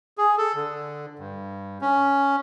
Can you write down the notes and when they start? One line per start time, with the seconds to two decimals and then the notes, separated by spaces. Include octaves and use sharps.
0.18 G#4
0.38 A4
0.55 D3
1.19 G2
1.81 C#4